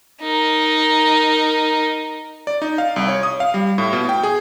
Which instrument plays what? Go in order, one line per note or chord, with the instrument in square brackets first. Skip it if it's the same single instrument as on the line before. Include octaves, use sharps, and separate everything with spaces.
[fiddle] D#4 A#4
[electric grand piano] D5
D#4
F5
C2
C#5
D#6
F5
G3
A2
B2
G5
G#4